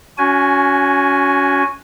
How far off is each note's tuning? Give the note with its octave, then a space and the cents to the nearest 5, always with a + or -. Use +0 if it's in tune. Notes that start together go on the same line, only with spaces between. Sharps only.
C#4 +25 F#4 +0 G#5 +0